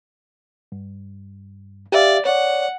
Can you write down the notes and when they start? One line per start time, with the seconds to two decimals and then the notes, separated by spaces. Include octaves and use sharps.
0.72 G2
1.92 G4 D5 E5 F5
2.25 C#5 D5 F#5